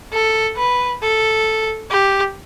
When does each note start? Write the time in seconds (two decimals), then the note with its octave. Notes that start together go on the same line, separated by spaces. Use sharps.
0.13 A4
0.57 B4
1.02 A4
1.90 G4